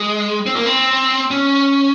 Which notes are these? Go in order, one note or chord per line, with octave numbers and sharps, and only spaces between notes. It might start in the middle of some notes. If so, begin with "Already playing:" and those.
Already playing: G#3
C4
A#3
C4
C#4